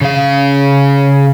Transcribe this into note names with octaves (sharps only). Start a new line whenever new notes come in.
C#3 F5